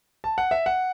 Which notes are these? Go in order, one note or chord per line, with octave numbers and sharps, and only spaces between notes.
A5
F#5
E5
F#5